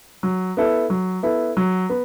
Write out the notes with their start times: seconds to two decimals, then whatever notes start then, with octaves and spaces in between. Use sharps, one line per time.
0.23 F#3
0.57 B3 E4 A4
0.90 F#3
1.23 B3 E4 A4
1.57 F#3
1.90 B3